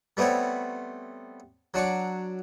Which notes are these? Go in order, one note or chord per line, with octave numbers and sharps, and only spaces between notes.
G3 A3 B3 C4 C#5
F#3 D4 C#6 D6